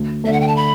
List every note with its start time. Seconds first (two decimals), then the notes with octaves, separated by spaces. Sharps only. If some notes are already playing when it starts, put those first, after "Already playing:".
Already playing: D2
0.24 D3 A3 E5
0.33 F#5
0.41 G5
0.48 A5
0.56 B5